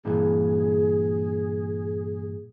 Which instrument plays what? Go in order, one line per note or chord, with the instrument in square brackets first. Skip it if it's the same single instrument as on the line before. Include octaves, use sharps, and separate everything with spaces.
[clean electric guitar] G2 A#2 E3 [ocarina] G#4